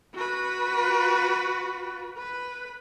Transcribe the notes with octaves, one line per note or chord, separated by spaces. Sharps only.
F#4 B4
B4